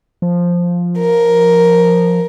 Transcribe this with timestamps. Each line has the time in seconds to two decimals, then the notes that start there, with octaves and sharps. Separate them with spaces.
0.22 F3
0.98 A#4